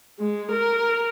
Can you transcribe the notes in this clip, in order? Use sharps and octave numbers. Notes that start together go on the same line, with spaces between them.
G#3
A#4